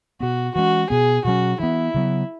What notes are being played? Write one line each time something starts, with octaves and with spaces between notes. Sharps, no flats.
B2 B3 F#4
E3 G#3 C#4 F#4
B2 B3 G#4
B2 F#3 C#4 F#4
E3 B3 E4
C#3 F#3 B3